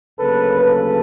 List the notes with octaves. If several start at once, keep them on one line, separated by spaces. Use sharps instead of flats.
D2 C#3 F#3 A#3 A4 B4
A4 B4